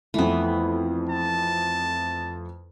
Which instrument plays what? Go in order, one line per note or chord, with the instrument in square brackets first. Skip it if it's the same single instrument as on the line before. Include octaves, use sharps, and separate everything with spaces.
[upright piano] F2 A3 [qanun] E3 B3
[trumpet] A5